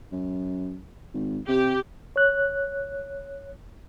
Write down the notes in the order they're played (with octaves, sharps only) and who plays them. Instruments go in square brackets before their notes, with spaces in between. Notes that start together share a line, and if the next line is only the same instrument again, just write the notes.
[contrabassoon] F#2
G#1
[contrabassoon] C3 [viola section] G4
[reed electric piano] C#5 F#6